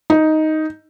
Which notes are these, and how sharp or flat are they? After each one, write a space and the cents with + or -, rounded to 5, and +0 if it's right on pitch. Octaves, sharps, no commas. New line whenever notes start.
D#4 +5